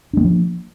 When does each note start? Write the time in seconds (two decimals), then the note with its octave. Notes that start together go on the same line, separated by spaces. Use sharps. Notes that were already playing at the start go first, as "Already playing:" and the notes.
0.13 D4
0.17 G#3
0.21 A#3
0.24 F3